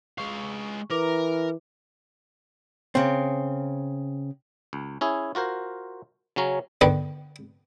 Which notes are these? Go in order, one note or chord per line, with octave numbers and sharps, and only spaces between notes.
G#3 F5 C#6
E3 A#4 B4 D6
C#3 C4
C#2
C#4 E4 G#4
F4 F#4 A#4 C5
C#3 F#3 C#4 A#5
D3 D#3 B3 B4